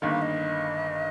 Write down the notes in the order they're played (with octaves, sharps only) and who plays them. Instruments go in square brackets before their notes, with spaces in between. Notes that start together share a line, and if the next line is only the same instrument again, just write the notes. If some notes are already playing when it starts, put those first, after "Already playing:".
[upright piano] G1 G2 D#3 A#3 [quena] D#5
[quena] F5
D#5